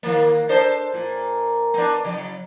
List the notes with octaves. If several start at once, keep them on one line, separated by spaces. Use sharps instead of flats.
D#3 A#3
D4 A4 C5
A#2
B3 D4
C#3 F#3